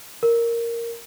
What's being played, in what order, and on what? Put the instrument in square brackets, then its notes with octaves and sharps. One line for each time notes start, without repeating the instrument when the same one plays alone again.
[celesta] A#4